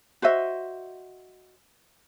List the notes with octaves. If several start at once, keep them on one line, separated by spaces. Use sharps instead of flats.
F#4 C5 D#5 E5